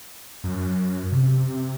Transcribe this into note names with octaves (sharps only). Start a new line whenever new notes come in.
F#2
C3